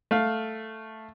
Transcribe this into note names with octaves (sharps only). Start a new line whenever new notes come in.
A3 F5